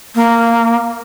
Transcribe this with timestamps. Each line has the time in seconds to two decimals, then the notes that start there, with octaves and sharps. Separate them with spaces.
0.15 A#3